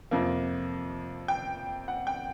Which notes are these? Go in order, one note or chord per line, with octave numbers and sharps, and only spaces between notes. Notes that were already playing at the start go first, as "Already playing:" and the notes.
F2 C3 F3 A#3
G5
F#5
G5